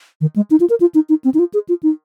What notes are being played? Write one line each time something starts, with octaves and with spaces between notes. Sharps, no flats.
D#3
G#3
D#4
F4
A#4
F4
D#4
D#4
C4
D#4
F4
G#4
F4
D#4